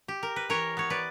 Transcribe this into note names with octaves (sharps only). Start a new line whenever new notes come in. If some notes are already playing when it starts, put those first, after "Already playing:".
G4
A#4
B4
E3 A#4 C#5
B3 C#5
B4 D5